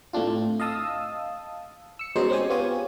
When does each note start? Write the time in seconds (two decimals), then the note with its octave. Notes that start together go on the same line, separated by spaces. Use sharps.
0.13 A2 A3 C4 D4 F4
0.60 D#5 F5 A5 D#6 E6
1.99 E6 C#7
2.16 B2 G#3 C#4 D#4 F#4 C5
2.30 C4 C#4 G4 C5 G#5
2.50 B3 F4 G4 C#5 G#5